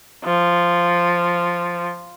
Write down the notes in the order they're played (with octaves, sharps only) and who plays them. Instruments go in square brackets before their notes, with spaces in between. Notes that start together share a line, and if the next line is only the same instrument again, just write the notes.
[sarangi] F3